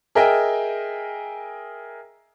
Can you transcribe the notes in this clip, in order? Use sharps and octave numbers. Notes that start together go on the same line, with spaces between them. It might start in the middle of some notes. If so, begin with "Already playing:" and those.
G#4 A#4 D#5 E5 G5 G#5